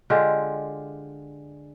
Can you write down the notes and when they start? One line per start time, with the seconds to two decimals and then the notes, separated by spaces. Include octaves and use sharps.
0.10 D3 G#3 F4 G4